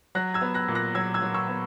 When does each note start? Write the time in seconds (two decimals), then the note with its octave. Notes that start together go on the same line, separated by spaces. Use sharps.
0.15 F#3 F#6 A#6
0.34 E6 G#6
0.42 B3
0.54 F#6 A#6
0.68 A#2
0.75 F#6 A#6
0.95 F#3 E6 G#6
1.14 E6 G#6
1.22 F#3
1.34 C#6 E6
1.49 B3